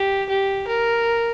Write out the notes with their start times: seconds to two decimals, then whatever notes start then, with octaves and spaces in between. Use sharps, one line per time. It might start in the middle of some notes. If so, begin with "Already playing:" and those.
Already playing: G4
0.29 G4
0.68 A#4